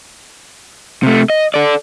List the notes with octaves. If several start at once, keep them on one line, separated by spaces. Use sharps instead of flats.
C3 A3
D#5
A4 D5